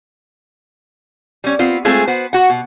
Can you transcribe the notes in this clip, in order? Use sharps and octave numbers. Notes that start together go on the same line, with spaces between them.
G3 C#4
B3 C4 F4
G#3 A3 C4 F4 G#4
B3 F#4 C5
F#4 F#5
B2